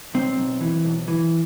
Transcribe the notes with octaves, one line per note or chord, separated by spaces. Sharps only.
B1 C4
B1
E3
B1
E3